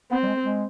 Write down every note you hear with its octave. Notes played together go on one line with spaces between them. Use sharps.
B3 C4
G3
G#3
G#3